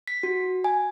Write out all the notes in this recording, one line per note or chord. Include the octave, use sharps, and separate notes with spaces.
B6
F#4
G#5